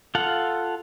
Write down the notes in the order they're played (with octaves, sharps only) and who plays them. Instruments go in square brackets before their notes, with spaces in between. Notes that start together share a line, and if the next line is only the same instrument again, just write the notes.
[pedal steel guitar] F4 A4 F5 F#5